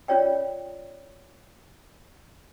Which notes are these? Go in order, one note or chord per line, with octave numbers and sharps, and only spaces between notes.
C#4 F4 C#5 D5 G5